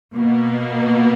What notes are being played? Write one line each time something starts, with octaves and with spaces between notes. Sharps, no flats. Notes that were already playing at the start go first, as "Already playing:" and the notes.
B2 A#3